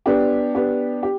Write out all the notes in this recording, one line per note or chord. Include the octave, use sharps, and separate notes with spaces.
B3 D4 G4
B3 D4 G4
G4